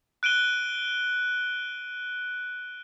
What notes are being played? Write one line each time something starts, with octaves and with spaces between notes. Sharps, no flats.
F#6 D7 D#7 G7